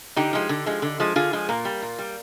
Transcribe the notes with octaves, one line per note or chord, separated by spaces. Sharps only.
D3 D#4 G4
F3 G#3
D3
F3 G#3
D3
F3 G#3
D3 F4 G#4
F3 G#3
A#2 A#3
G3
A#2
G3